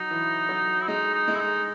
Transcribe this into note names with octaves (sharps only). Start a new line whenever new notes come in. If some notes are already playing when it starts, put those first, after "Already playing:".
Already playing: F#3 D#4
E3
F#3
E4
G#3 D#4
D#4
G#3
E4
D#4